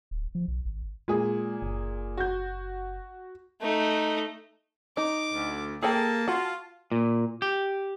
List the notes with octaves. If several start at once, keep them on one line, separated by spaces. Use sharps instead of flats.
D1
F3
B1
G#1
A#2 G#3 G#4
F#1
F#4 G6
A3 D#4
D#4 D6
D2
A#3 G#4 A4 G5 A5
F4 F#4
A#2
G4